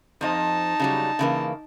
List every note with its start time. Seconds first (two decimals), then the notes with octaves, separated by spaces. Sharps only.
0.21 F2 F3 D#4 D#5 A5
0.80 C#3 F#3 G3
1.19 C#3 E3 A#3